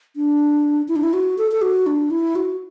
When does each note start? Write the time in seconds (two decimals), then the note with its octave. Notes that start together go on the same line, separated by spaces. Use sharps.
0.16 D4
0.88 E4
0.96 D4
1.03 E4
1.13 F#4
1.38 A4
1.52 A4
1.62 F#4
1.87 D4
2.11 E4
2.36 F#4